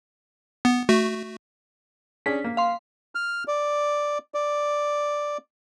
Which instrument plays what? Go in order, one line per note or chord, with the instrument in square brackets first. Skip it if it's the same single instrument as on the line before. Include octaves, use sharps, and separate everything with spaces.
[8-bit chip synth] B3
A3 F#4
[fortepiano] C#4 D4 G#4 [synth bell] B6
[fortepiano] A#3
[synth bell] F5 C6
[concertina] F6
D5
D5